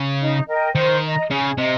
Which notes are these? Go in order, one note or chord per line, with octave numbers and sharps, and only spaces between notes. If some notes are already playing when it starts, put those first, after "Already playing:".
Already playing: C#3
D#4
A#4 D#5 G5
D#3 C5
D#5 A#5
C#3 G#4
C3 D#5 A#5